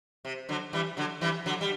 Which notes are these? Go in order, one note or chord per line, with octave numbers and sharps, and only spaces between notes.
C3
D3 F#3
E3 G3
D3 F#3
E3 G3
D3 F#3
G3